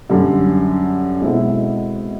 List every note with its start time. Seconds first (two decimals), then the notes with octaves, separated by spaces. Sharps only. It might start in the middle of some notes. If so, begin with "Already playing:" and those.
0.09 F#2 D3 G3
1.21 B2 G#3 C4 E4 A4